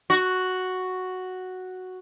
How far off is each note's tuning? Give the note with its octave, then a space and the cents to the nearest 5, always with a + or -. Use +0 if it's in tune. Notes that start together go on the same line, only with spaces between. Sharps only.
F#4 +0